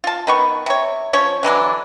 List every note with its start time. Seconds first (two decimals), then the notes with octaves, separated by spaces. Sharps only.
0.04 F4 A5
0.27 D#3 B3 C#6
0.66 C3 C#5
1.13 F3 C#4 C#5
1.43 D3 E3 F#3 D4